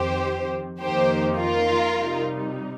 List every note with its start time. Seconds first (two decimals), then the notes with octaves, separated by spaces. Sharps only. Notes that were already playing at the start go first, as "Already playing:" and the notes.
Already playing: F2 D#3 C4 G4 C5
0.81 F2 D#3 A#3 D#4 G4 C5
1.39 F4 A#4
1.95 C3 G3 D#4